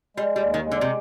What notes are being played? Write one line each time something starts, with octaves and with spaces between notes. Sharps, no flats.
G3 G#3
G3
D#2
D#3
G#3
D3
C3